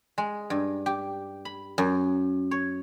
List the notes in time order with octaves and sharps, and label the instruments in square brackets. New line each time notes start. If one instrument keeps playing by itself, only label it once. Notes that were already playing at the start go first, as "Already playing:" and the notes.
[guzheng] G#3
G2
G4
B5
F#2
C#5